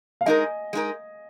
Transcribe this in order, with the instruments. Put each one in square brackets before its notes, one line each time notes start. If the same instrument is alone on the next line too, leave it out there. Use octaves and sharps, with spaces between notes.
[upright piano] F5
[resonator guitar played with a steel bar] G#3 D#4 A#4 [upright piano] D#5 G#5
[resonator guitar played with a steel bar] G#3 D#4 A#4